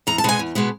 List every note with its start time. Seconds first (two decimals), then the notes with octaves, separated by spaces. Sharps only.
0.07 E2 A#5
0.18 A5
0.24 B2 G#3 B3 G#5
0.39 E2
0.55 B2 G#3 B3